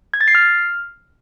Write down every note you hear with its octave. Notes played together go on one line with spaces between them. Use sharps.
G#6
A6
C7
F6